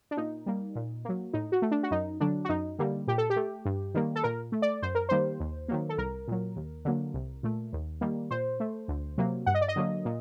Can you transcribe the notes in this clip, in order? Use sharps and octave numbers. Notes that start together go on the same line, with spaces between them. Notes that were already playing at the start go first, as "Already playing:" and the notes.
D4
A#2 D#4
G3 A#3
A#2
F#3 A#3
A2 D#4
F#4
A3
D4
F#4
F#2 D#4
D3 F#3 D4
F#4
F#2 D#4
D3 G3 A#3
A#2 G4
A4
G4
A3
G2
D#3 G3 A#3
A4
A#2 A#4
A3
D5
F#2 C5
A#4
D#3 G3 A#3 C5
D#2
D#3 F#3 A#3
A4
C2 A#4
A#2 F#3
D#2
D3 F#3 A#3
C2
A#2 A3
D#2
D#3 G3 A#3
A#2 C5
A3
D2
C3 F#3 A#3
G2 F#5
D#5
D5
D#5
D3 F#3 A#3
A#2